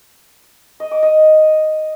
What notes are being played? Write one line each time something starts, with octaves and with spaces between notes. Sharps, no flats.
D#5
D6
D#5